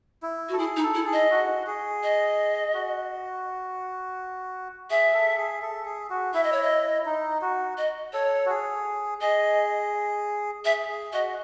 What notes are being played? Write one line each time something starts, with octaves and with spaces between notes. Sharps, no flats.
E4
F#4 A4
E4 G#4
D#4
A4
E4
G#4
D#5
F#4
G#4
D#5
F#4
G#4 E5
A4
G#4
A4
G#4
F#4
E4 E5
D#5
C#5
D#5
D#4
F#4
D#5
A4 C#5
F#4
G#4
G#4 D#5
G#4 E5
G#4
F#4 D#5